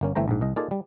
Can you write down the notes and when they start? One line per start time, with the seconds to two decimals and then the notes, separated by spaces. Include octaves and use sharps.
0.01 G1 A#3 C#4
0.15 G1 E3 A3 C4 C5 A#5
0.28 A#1 G#2
0.41 C2 D#5
0.56 A#3 D#4 F4 G#4 A4 D5
0.71 G3